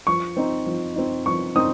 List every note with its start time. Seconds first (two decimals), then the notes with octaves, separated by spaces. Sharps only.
0.07 F3 C#6
0.37 C4 D#4
0.66 F3
0.96 C4 D#4
1.26 F3 C#6
1.56 C4 D#4 D#6